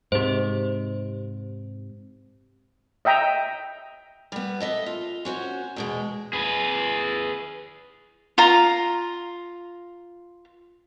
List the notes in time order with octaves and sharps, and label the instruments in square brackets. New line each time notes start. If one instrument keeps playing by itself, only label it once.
[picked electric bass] G#2 C3 [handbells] G4 C5
[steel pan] D#5 E5 G5 A#5
[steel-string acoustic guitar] G3 B3
A4 D#5 E5
F4
C#4 F#4 C5
E2 B2 G#3
[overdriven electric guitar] G#4 B4
[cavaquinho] F4 A#5